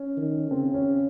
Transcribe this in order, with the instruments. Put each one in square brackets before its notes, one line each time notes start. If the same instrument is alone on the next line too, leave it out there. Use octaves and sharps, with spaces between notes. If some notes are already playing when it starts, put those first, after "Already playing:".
Already playing: [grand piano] C#4
[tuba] D#3
[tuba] C#3 [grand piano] C4
[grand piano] C#4